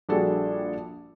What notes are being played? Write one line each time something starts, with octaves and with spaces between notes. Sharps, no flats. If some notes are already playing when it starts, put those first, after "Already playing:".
A#1 G3 D4 F#4 G#4 A4